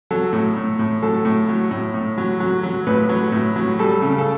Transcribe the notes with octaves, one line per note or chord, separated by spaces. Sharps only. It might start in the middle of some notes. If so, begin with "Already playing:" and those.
F#3 A4
A2
A2
A2
F#3 A4
A2
F#3
A2
A2
F#3
F#3
F#3
A2 B4
F#3
A2
F#3
G3 A4
C#3
A4